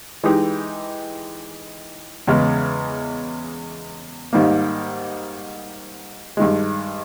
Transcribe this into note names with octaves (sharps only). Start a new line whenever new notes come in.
E3 G#3 D#4 G4
E2 C#3 G#3
G#2 D#3 G3 A#3
G2 D#3 G#3